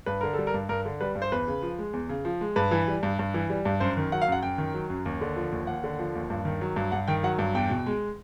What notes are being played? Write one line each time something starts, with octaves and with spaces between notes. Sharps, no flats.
G2 B4
D3 A#4
G3 A4
A#4
G2
G2 A#4
D3
G3 B4
G2
C5
E2 B4
C#3
F3
G#3
E2
C#3
F3
G#3
G2 B4
E3
G3
G2
G2
E3
G3
G2
F#2 C5
D#3
F#3 F#5
F5
F#2 F#5
F#2 G5
D#3
F#3
F#2
D#2
D3
F3
D#2
D#2 F#5
D3
F3
D#2
G2
D#3
F#3
G2
G2 F#5
D#3 G5
F#3 F#5
G2
E2 G5
B2
G#3